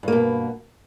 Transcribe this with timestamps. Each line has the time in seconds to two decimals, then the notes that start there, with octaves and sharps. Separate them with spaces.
0.03 G2
0.08 A#3
0.12 B2